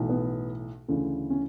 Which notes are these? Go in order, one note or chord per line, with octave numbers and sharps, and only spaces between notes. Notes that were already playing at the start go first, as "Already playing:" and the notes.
Already playing: B1 A2 E3
B3
D2 C#3 E3
C#4